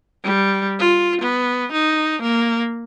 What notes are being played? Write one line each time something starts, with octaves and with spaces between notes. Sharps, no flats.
G3
F4
B3
D#4
A#3